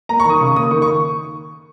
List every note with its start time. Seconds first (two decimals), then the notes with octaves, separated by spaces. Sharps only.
0.09 A#3 A#5
0.20 C#6
0.25 D#3 D#6
0.40 C#3 C#6
0.56 A#3 D#6
0.71 D#3 C#6
0.82 C#6